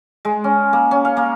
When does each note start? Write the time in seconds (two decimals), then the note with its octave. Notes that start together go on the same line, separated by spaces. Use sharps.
0.25 G#3
0.44 C#4
0.73 A#3
0.91 C#4
1.05 F5
1.17 A#3